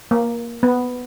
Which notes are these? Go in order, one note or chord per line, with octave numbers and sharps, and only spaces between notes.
A#3
B3